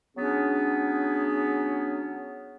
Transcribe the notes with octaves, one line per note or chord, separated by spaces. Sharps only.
F#3 B3 C#4 D4 G#4